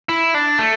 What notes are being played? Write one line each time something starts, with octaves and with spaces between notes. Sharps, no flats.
E4
D4
A3